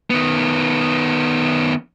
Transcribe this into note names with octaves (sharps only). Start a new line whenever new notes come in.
D#3 B3